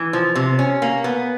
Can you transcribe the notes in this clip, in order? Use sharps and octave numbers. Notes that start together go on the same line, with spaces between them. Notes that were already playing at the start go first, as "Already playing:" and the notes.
Already playing: E3
F3
C3
C#4
A#3
B3